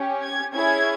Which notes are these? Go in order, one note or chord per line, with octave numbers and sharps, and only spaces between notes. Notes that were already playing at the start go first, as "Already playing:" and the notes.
Already playing: C#4 G4
G#6
C#4 E4 G#4 G#6